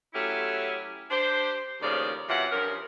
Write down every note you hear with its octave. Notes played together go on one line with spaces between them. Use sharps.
F#3 A3 C#4 E4 G4
D4 G4 C5
D#2 A2 C#3 F3 D5
C3 E3 F#3 F4 F#5
G2 F3 C#4 A#4